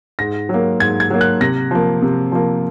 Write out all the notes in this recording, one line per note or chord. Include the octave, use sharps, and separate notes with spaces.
G#2 A#6
F#3
A#3
G#2 G#6
G#6
F#3 A#3
F#6
C3 A#6
F3 A#3
C3
F3 A#3